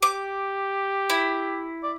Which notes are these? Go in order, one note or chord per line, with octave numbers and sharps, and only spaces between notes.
G4 D6
E4
D5